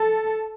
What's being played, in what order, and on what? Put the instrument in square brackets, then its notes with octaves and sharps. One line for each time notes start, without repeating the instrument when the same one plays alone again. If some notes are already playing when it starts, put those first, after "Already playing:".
Already playing: [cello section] A4